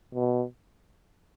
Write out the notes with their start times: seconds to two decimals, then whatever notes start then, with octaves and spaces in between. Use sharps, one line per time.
0.15 B2